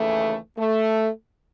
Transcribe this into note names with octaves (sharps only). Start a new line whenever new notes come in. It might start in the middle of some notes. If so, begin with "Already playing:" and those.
Already playing: D#2 C#3 E3 A3
A3